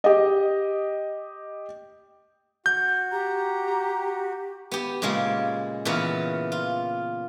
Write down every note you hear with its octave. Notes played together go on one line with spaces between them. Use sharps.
G4 D#5
F#4 G6
G4 A#5
B3 G4
A#2 C#3 G#3 A#3
A#2 C#3 E3 B3 A#4
F4